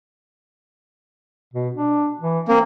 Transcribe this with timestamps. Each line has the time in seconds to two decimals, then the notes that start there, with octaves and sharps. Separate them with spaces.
1.53 B2
1.75 D4
2.20 E3
2.48 A#3 C4